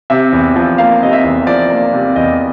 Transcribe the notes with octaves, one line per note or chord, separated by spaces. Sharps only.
C3 E5
E2
F3
A#3 F5
C3 D#5
E5
E2
F3 D5
A#3
C3
E2 D#5